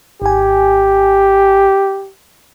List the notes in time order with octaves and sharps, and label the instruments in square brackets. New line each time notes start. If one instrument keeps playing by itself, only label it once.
[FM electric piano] G#1 G#5 [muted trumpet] G4